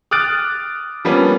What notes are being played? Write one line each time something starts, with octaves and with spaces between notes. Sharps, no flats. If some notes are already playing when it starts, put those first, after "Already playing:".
D6 D#6 F6 F#6 A6 D7
F3 G3 A#3 B3 C#4 D4